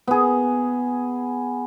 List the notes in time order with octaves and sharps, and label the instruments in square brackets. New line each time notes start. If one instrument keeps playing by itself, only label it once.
[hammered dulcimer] B3 G#4